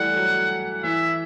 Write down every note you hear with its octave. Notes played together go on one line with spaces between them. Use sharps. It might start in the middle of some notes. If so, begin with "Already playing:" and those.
Already playing: E3 G3 A3 F#5
F#3
E3 E5